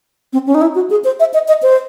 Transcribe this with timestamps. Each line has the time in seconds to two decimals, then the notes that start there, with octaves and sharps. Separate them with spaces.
0.33 C4
0.47 C#4
0.55 D#4
0.62 E4
0.75 F#4
0.90 G#4
1.04 C5
1.20 E5
1.34 D#5
1.48 D#5
1.63 C5